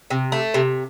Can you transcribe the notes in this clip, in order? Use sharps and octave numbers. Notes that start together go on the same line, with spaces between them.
C3
A3
C3